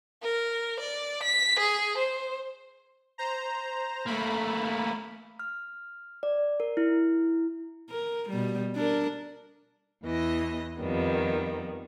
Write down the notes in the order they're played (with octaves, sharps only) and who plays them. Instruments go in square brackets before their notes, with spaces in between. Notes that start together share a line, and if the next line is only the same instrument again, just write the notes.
[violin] A#4
D5
B6
G#4
C5
[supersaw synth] C5 A#5
[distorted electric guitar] A3 A#3 [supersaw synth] B5
[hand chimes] F6
D5
A#4
E4
[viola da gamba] A#4
B2 G3
D4 A#4
[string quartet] E2 E3 D#5 A#6
F2 D#3 G3 B3